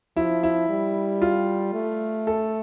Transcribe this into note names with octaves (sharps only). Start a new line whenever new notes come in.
F3 E4
E4
G3
F4
A3
A4